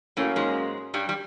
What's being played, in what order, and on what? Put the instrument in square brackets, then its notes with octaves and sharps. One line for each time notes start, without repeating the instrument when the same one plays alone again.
[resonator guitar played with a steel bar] A2 A3 [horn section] F#3 A#3 C#4
[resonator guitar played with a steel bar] G#2 G#3
G2 G3
G3